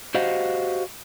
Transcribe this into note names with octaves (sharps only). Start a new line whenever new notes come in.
F#4 G4 C5 D#5 F5 F#5